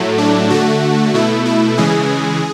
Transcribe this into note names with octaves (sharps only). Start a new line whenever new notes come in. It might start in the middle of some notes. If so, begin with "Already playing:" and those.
Already playing: A2 F#3 A3
D4
D3 A3 F#4
B2 A3 E4
E4
C#3 E3 G#3 G#4